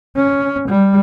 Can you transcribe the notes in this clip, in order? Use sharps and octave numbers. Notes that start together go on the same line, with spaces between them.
C#4
G3